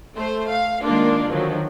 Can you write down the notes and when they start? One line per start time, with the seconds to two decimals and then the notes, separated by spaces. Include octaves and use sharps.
0.15 A3 C5
0.51 F5
0.85 D#3 G#3 A#3 D4 F4
1.29 D3 D#3 F3 F#3